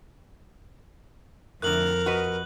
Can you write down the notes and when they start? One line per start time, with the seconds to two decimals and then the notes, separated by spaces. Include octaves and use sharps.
1.62 F2 A2 D3 A#4 F#6 F#7
2.06 F#4 B4 D#5